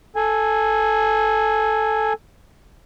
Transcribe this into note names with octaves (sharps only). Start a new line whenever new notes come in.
A4 G#5